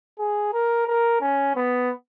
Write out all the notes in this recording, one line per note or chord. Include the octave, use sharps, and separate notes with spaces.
G#4
A#4
A#4
C#4
B3